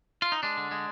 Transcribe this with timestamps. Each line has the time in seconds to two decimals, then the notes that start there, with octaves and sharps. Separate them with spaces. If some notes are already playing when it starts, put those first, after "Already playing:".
0.22 F4
0.32 D#4
0.43 G#3 D4
0.57 D3
0.71 G#3